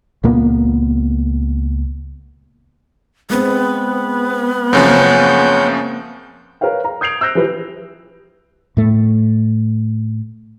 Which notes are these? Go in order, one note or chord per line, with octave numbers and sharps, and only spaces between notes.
C#2 A#2 A#3 B3
G#3 B3 C4
F#2 C#3 F3 A#3 C4 C#4 F#5 G6
A#4 B4 C#5 F5 G5
A#5
D#6 G6 G#6 C7 D7 F7
E6 F#6 G6 A#6 D7
E3 F3 G3 B4
A2 A3